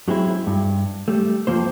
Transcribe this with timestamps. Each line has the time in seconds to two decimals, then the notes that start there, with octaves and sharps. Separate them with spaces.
0.08 F#3 G#3 C4 E4
0.47 G2
1.08 G3 A3
1.47 F2 F3 A#3 C5